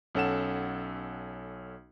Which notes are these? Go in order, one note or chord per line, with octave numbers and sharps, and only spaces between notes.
B1 C#4 A4 F#5 E7